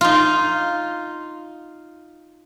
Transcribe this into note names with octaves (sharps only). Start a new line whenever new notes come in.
D#4 F4